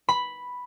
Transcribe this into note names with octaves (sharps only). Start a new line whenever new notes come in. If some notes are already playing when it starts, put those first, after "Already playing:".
B5